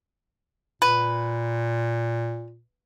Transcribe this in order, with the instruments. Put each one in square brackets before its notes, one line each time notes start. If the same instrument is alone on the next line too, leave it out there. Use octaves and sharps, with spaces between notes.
[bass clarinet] A#2 [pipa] B4